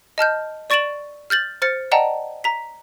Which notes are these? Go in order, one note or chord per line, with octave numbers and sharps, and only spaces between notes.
D#5 A5 F6 G6
D5 C#6 A6 D7 E7 F#7
F6 G6 A6 F#7
C5 F6 A6 C#7
D5 D#5 F#5 G5 A5 A#5
A#5 B6